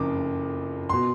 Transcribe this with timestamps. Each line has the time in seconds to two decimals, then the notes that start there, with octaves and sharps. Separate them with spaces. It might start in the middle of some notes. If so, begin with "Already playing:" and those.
Already playing: F#1 F2 C#3 D6
0.89 B2 C6